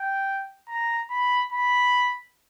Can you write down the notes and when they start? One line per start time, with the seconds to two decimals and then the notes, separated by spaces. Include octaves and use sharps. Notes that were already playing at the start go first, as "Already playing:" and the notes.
Already playing: G5
0.69 A#5
1.10 B5
1.53 B5